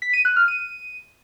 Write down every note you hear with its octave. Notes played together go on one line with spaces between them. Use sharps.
B6
D#7
F#6
F6
D#7